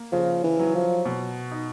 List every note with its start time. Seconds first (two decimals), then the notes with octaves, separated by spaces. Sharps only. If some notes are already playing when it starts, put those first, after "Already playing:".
Already playing: A#3
0.12 C#3 F3
0.44 E3
0.59 F#3
0.75 F3
1.05 B2
1.52 D#4